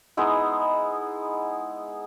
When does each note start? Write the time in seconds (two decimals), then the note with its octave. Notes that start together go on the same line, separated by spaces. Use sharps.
0.17 G#3 B3 D#4 E4